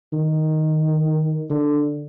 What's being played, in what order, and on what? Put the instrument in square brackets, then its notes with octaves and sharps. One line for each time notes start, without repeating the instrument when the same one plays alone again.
[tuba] D#3
D3